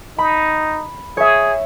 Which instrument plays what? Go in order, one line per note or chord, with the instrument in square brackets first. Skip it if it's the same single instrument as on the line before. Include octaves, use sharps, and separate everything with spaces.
[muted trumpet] D#4 [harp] B5
[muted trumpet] G#4 [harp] C#5 E5